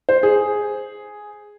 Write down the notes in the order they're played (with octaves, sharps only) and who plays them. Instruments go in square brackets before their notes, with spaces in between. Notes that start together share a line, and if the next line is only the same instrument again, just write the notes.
[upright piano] C5
G#4